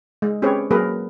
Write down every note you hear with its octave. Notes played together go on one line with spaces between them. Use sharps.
G#3
C4 C#4 G4 G#4 B4 C#5
F#3 A#3 G#4 A#4 B4